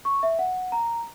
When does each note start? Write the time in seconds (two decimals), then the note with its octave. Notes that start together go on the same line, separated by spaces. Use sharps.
0.05 C#6
0.23 E5
0.39 F#5
0.72 A#5